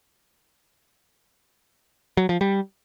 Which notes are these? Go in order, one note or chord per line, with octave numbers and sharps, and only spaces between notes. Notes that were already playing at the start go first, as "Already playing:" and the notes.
F#3
F3
G3